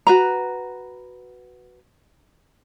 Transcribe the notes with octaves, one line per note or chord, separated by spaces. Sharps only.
F#4 B4 A#5